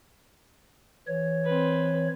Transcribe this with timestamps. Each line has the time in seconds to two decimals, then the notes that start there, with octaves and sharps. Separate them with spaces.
1.08 E3 C#5
1.45 C4 B4